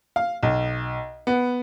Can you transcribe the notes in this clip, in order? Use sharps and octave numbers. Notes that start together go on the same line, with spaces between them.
F5
B1
B3